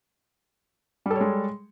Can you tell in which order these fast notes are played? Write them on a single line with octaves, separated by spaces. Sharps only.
G3 A4 C#5 G#3